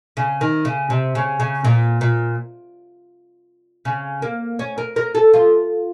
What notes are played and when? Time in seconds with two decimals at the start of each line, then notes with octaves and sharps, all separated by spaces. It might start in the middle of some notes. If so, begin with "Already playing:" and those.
0.17 C#3
0.41 D#3
0.65 C#3
0.90 C3
1.15 C#3
1.40 C#3
1.65 A#2
2.01 A#2
3.85 C#3
4.22 A#3
4.59 C#4
4.78 A#4
4.96 A#4
5.15 A4
5.34 F4